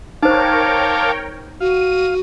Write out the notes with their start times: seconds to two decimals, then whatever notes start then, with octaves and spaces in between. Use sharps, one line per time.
0.23 D#4 A#4 C5 C#5 F5 G5 A5 D6
1.60 F#4 F5 D#7